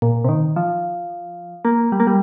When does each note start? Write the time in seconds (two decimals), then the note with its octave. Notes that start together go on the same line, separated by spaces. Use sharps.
0.02 A#2
0.24 C3
0.29 D#3
0.56 F3
1.65 A#3
1.92 G3
2.00 A#3
2.07 G3